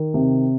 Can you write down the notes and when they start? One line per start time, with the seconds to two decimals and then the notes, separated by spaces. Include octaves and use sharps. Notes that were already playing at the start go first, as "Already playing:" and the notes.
Already playing: D#3
0.14 C3